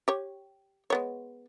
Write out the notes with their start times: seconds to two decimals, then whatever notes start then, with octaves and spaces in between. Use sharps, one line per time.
0.08 G4 C#5
0.90 G#3 B3 C#5